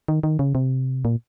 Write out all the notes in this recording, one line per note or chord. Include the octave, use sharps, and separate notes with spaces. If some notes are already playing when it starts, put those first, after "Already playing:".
D#3
D#3
C#3
C3
A#2